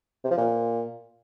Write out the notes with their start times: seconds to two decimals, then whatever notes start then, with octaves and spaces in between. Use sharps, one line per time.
0.24 C3
0.31 F3
0.37 A#2